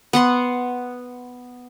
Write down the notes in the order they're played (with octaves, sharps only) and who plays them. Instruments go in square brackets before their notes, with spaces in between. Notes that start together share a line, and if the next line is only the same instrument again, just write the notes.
[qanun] B3 F#5 C6